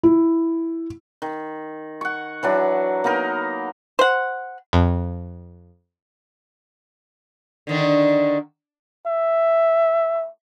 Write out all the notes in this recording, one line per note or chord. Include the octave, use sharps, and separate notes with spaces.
E4
D#3
F#5 C#6
E3 F#3 D4
A#3 B3 D#4 A#4
C5 F#5
F2
D3 D#3 D4
E5